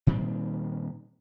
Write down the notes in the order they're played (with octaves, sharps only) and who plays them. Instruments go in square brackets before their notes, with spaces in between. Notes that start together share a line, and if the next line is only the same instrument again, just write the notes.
[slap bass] A#2 D#3 G3 C4